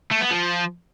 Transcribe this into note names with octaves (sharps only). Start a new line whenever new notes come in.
A3
B3
F3